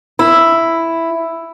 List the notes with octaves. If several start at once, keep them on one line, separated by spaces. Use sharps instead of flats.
E4